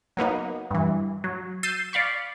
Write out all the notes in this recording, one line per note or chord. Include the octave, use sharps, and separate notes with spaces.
F#3 A#3 B3 D#4
G2 E3
F#3
E6 G6 A6 C7 D#7
D5 F5 B5 C#6